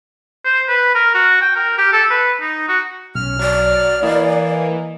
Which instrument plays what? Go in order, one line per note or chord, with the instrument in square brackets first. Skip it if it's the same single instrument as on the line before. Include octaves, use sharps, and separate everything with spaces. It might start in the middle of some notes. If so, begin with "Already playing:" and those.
[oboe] C5
B4
A#4
F#4
G5
A#4
G4
A4
B4
D#4
F#4
[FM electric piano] B1 [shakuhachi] C#4 [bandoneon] F6
[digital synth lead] F#3 [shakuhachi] D5
[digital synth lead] E3 [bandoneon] A#3 [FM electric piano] D#5